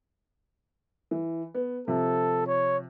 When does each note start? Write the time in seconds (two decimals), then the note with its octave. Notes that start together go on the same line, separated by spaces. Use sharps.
1.11 E3
1.54 B3
1.88 C3 F3 A4
2.47 C#5